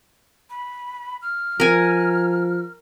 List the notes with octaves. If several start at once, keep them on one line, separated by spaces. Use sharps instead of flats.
B5
F6
F3 A#4 G#5